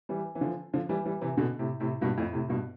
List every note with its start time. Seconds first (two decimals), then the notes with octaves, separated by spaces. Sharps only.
0.09 E3 G3
0.35 E3
0.41 D3 F3
0.73 D3 F3
0.89 E3 G3
1.05 E3 G3
1.21 C3 E3
1.37 B2 D3
1.59 A2 C3
1.80 A2 C3
2.01 G2 B2
2.17 F2 A2
2.33 A2 C3
2.49 G2 B2